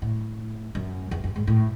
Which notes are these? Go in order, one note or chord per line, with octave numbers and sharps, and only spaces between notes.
A2
F#2
E2
F#2
G#2
A2